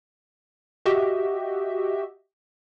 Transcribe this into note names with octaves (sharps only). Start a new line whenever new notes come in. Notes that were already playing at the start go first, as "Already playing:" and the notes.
F#4 G4 D#5 E5